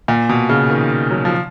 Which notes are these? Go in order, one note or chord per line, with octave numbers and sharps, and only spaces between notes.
A#2
B2
C#3
D#3
F#3
F3